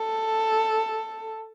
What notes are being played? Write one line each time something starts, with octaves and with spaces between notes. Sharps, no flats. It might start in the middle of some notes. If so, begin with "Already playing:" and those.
Already playing: A4